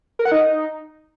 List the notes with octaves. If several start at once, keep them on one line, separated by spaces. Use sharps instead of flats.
A#4
F#5
D#4